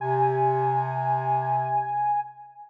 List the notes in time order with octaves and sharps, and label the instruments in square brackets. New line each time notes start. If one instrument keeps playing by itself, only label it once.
[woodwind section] C3 [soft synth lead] G#5